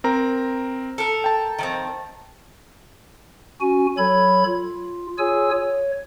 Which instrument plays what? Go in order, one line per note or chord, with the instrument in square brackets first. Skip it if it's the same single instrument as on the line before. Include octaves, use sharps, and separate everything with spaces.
[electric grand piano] C4 A#4 A#5
[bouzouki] A4 A#4
[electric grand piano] G5 A5
[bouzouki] D#3 F3 C4
[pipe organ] C#4 F#4 G#5
F#3 A4 C#5 B5 G#6
F4
F4 G#4 C#5 G#5 E6
C#5